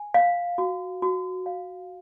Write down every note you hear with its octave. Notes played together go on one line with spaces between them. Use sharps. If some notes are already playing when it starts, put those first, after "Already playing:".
Already playing: G#5
F5
F#4
F#4
F5